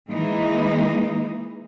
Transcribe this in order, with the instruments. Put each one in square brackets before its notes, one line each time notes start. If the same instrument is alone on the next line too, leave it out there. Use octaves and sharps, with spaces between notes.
[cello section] E3 G#3 A#3 D#4